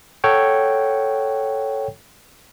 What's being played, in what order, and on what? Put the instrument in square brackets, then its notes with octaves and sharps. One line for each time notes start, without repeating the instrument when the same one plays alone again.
[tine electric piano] A4 C#5 F#5 G5